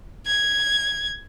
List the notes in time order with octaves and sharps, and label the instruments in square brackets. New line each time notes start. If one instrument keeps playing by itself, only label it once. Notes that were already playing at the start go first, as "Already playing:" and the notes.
[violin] G#6